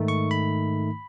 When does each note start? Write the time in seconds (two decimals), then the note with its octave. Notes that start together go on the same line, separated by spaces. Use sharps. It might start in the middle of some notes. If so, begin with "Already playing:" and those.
Already playing: G#2 D#3 A3 D#4
0.08 C#6
0.31 B5